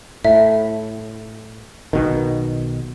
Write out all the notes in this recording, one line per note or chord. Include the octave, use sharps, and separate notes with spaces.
A2 E5
B1 B2 D#3